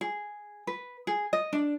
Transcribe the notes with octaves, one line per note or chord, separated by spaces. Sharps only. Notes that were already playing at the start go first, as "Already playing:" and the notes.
G#4
B4
G#4
D#5
D4